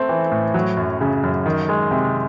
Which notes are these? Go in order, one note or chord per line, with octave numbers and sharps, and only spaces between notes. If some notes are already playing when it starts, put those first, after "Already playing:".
Already playing: A3 C4
E3
A2
F#3
F#2
C#3
F#2
D#3
G#3
C3